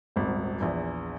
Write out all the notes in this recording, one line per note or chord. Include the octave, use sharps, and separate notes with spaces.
D#1 G#1
A#1 E2